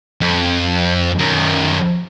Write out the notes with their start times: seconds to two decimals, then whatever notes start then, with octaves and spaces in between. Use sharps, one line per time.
0.21 F2
1.19 F#2 D#3